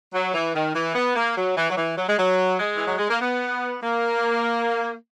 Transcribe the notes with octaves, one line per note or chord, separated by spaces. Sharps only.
F#3
E3
D#3
E3
B3
A#3
F#3
E3
F#3
E3
F#3
G#3
F#3
G#3
E3
F#3
G#3
A#3
B3
A#3